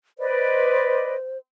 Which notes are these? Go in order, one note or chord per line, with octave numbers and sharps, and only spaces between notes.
B4 C5 D5 D#5